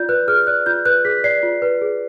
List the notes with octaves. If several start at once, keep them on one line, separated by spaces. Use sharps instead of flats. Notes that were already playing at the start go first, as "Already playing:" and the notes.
Already playing: F4 D5 G6
B4 F#6
G#4 F6
D5 F#6
F4 G6
B4 F#6
G#4 B6
D5 C7
F4
B4
G#4